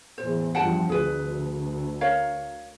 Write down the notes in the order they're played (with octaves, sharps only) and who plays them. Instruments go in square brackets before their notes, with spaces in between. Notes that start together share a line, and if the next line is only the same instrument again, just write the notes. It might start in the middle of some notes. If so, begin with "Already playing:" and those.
[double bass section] E2 A2 [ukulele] C5
[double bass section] G2 F3 [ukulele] F#5 G5 A5
[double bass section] D2 [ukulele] G#4 B4
[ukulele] A#4 C#5 F5